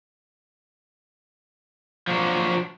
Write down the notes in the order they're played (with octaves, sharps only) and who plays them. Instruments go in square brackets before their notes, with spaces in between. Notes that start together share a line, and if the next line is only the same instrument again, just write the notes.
[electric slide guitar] F3 F#3 D4